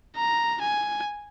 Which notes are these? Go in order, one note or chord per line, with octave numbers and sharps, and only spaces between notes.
A#5
G#5